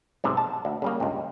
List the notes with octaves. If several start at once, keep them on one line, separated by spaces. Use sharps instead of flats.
B1 G#2 C3
A5
D2
C#3 G3 A#3
C#2 G2